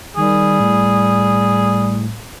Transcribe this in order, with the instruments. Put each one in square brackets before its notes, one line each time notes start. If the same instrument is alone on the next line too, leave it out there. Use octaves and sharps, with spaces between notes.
[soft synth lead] D#3 [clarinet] G3 [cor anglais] G#4
[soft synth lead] A2